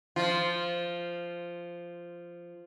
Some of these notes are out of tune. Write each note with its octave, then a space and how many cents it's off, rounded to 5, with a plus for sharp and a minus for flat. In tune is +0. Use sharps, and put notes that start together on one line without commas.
F3 -10 F4 +0